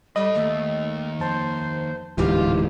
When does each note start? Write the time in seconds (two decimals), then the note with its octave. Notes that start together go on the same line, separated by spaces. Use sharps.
0.16 G3 A4 D#5 B5
0.35 D#2 A3
1.19 F2 C5 A5
2.18 D1 G#2 E3 F4 G4 F5